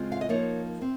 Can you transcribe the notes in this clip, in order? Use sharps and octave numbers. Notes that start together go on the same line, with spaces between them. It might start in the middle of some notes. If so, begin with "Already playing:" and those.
Already playing: C#3 G#3 C4 F4
F5
D#5
F3 A#3 D#4 A#4 C#5
C4